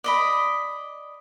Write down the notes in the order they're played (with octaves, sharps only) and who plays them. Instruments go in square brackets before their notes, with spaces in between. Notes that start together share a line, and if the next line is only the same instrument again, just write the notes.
[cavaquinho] D5 D#5 B5